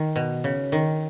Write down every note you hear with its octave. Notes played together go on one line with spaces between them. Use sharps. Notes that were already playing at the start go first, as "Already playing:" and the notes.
Already playing: D#3
B2
C#3
D#3